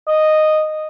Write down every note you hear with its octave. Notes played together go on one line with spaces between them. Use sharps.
D#5